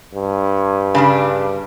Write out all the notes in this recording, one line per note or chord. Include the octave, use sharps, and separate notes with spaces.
G2
C#3 G3 D4